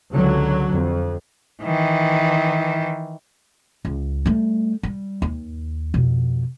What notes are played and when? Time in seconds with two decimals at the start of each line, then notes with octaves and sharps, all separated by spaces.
0.14 C#2 D3 F#3
0.74 F2
1.62 D#3 E3
3.85 C#2
4.26 G3 A3
4.83 G3
5.22 D#2
5.94 F2 B2